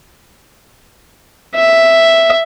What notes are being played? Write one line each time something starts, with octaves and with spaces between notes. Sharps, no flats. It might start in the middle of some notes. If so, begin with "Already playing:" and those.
E5